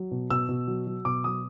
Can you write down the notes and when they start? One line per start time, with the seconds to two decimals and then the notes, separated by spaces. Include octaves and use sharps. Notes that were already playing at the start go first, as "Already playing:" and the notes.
Already playing: F#3
0.11 B2
0.30 B2 E6
0.49 B2
0.68 F#3
0.87 F#3
1.05 B2 D6
1.24 F#3 D#6